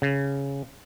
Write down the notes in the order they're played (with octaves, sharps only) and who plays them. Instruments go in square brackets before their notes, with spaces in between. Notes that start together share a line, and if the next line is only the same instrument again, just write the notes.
[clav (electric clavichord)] C#3